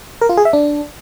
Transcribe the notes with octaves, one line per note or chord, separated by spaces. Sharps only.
A#4
F4
G#4
E5
D4